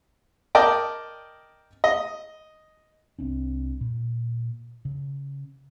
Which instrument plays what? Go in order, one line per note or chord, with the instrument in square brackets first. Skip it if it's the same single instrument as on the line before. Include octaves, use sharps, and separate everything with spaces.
[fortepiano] A#4 D5 D#5 G5 A5
D#5
[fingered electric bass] C2 C4 D4
A#2
C#3